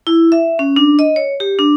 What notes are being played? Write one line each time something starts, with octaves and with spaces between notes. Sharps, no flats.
E4
E5
C#4
D4
D#5
C#5
G4
D4